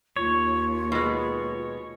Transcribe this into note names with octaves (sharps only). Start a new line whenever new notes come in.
D#2 F4 C#5
B2 G#3